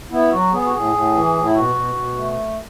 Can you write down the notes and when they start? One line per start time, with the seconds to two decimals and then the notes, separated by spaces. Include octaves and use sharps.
0.11 B3 E4
0.32 F#3 F#4
0.52 B3 G#4
0.66 F#4
0.73 A2 G#4
0.93 A2
1.14 E3
1.34 A2
1.43 E4
1.55 B2 F#4
1.75 B2
1.95 B2
2.16 A3